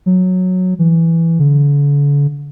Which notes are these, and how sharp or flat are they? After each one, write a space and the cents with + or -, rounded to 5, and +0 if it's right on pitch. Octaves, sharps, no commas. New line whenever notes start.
F#3 -10
E3 +5
D3 -40